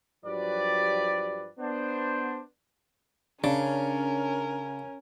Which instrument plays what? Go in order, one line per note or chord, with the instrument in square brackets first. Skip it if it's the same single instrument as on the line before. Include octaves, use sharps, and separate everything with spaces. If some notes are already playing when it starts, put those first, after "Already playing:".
[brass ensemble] G2 F3 F#3 G4 B4 D5
B3 D4 C5
[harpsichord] C#3 [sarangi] C#4 [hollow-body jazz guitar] D4 [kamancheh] A#4